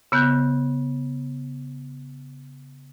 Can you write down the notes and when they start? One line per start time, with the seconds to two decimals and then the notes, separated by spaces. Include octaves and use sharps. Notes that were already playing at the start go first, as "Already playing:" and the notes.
0.12 C#3 B3 F#6 G6